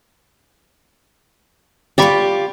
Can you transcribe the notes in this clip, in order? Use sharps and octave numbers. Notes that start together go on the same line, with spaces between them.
F4 G4 D5 B5 C#6